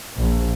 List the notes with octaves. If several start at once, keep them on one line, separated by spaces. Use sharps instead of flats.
A#1